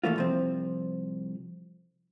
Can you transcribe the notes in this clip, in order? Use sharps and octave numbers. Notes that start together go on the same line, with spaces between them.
E3 A3 A#3 F4
C2 F3 C4